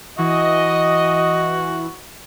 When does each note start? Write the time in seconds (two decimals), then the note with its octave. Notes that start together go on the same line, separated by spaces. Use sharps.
0.19 E3 F#4 D#5